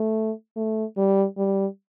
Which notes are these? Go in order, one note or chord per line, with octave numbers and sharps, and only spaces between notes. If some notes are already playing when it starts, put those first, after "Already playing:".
Already playing: A3
A3
G3
G3